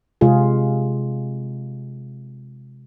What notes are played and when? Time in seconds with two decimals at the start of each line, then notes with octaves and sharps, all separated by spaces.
0.21 C3 G#3 F4 G#4